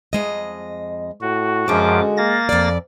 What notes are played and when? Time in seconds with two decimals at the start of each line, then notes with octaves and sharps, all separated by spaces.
0.13 F2 G#3 D#5
1.21 A2 F#4
1.68 F#2 D3 F3 G#3 F#4 D6
2.17 A#3 A6 A#6
2.49 F2 D5